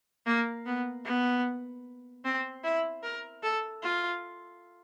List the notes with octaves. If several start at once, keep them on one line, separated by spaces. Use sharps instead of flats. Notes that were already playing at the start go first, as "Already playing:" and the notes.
A#3
B3
B3
C4
E4
A#4
A4
F4